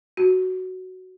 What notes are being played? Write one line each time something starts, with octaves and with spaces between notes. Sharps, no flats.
F#4